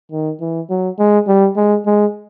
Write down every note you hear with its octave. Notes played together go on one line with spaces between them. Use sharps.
D#3
E3
F#3
G#3
G3
G#3
G#3